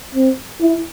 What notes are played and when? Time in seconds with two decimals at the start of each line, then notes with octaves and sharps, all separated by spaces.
0.15 C4
0.61 E4